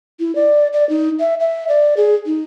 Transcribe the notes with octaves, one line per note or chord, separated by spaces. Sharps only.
E4
D5
D5
D#4
E5
E5
D5
G#4
D#4